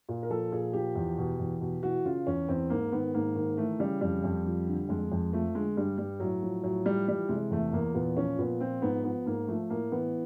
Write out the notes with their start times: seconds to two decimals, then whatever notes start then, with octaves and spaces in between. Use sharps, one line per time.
0.09 A#2
0.23 A#4
0.30 F3 A4
0.52 A#2 G#4
0.73 F3 G4
0.95 E2
1.18 B2
1.40 E2
1.61 B2
1.83 E3 F#4
2.05 C#3 F4
2.27 E2 C#4
2.48 E2 C4
2.70 G#2 A#3
2.92 D#3 B3
3.14 G#2 A#3
3.36 D#3
3.57 E3 A3
3.79 C#3 G3
4.01 F2 G3
4.24 F2
4.46 F3
4.68 D3
4.89 F2 G#3
5.12 F2
5.32 F3 A3
5.55 D3 G#3
5.76 G2 G3
5.98 G2 G3
6.20 A2 F#3
6.42 F3
6.63 A2 F#3
6.86 F3 G3
7.08 E3 G3
7.29 C3 G#3
7.51 E2 A3
7.73 E2 A#3
7.95 A#2 B3
8.17 F3 C#4
8.39 A#2 B3
8.60 F3 C4
8.82 G#2 B3
9.04 F3 B3
9.26 G#2 A#3
9.48 F3 A3
9.70 A2 A#3
9.92 E3 B3